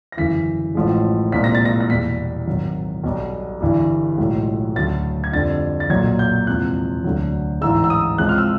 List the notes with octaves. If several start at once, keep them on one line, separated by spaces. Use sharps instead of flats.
A#6
G1 F#2 C#3 E3 B6
A1 A2 F3 G#3
C2 A#2 F3 G#3 B6
A#6
A6
A#6
A#6
E2 B2 G3 B6
G#1 G#2 D#3 F#3
B1 B2 G3
G1 G2 E3 G3
B1 A2 F3 G#3
D2 C#3 F#3 A6
G#6
F2 D3 G3 A6
A6
B1 A#2 F#3 G#6
G6
E2 C3 F3 G#3 F#6
D2 D3 F#3
A1 G#2 E3 G#3 E6
E6
D#6
C#2 C3 F3 G#3 F#6
F6
E6